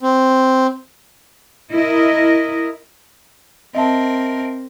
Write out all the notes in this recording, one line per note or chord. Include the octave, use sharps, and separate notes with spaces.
C4
E4 A#4 D#5
C4 A#4 D#5 E5 A5